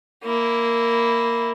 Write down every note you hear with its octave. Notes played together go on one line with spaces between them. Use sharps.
A#3 E4